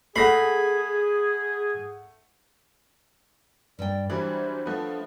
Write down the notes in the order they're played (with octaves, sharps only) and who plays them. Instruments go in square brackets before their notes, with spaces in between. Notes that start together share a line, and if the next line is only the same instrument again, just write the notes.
[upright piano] A3 [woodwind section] G#4 [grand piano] F#5 A#6 C7 [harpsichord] B5
[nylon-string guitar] G2 G5 [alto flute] D5
[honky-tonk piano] E3 F#3 G3 [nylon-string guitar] D4 [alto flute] C5
[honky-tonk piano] F3 B3 [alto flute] A3